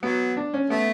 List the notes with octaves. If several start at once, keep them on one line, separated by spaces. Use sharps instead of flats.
F#3 B3
D4
C#4
A3 B3